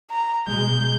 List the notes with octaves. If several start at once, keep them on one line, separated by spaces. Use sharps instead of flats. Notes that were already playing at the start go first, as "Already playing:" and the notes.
A#5
B2 G#3 G6